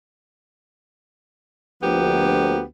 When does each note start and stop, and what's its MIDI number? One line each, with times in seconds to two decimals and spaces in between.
1.83 2.61 38
1.83 2.61 53
1.83 2.62 58
1.83 2.62 59
1.83 2.62 67